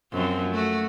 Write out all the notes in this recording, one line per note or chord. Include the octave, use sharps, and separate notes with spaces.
F#2 F3 C4
A3 F#4